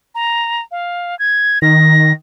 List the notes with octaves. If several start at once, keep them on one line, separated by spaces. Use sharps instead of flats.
A#5
F5
G#6
D#3 A#6